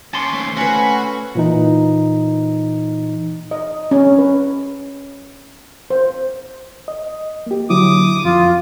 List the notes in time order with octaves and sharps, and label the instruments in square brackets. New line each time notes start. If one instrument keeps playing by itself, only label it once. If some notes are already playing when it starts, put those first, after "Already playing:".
[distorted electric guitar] D#2 C#4 [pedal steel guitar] A5 C6 D6
[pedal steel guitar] A3 A4 C5
[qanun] C#4 B4 [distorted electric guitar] F#4 F#5 [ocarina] G#5
[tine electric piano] A#2 E3 D#4
[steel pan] D#5
C#4
B4
C5
[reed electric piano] D#5
A#3 G4
[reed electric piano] D3 F#3 E4 [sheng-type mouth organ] D6 D#6
[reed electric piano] F2 [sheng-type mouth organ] F4